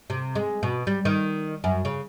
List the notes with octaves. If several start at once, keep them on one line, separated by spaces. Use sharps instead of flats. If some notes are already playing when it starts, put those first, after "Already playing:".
C3
G#3
B2
G3
D#3
F#2
C#3